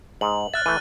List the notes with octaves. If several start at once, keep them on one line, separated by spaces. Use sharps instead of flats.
G#2 F#7
E5 F6 F#6 A6
E3 A3 D#7